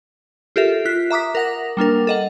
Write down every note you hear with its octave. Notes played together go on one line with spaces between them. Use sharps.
F4 G4 A4 A#4 E5
F4 F#6 B6
E5 A#5 D6 D#6 B6
A#4 F#5 A#6
G3 A#3 D4 A#4
A4 D#5 F#5